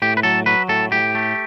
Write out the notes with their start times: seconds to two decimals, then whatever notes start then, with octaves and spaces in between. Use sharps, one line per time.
0.02 A2 G4
0.17 B4
0.23 F#3 A4
0.46 F#3 B4
0.69 A2 A4
0.92 A2 G4
1.15 A3